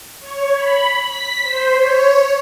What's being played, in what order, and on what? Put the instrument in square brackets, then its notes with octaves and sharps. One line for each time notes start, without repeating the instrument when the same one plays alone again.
[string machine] C#5
B5
B6
C5
C#5